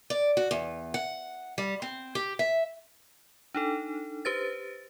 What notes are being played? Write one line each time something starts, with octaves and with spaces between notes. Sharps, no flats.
D5
F#4
E2
F#5
G3
C4
G4
E5
D4 D#4 A4
G4 B4 C5 A6